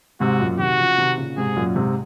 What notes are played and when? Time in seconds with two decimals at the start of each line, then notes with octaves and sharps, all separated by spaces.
0.20 G#2 C3 F#4
0.40 F#2 A#2
0.59 C3 D#3 F#4
0.79 C#3 F3
0.98 C3 D#3
1.18 A#2 C#3
1.37 G#2 C3 G#4
1.57 F#2 A#2
1.76 G#2 C3